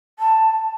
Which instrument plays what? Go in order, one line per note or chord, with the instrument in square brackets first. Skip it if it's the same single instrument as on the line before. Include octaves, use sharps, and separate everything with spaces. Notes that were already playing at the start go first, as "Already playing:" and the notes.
[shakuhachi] A5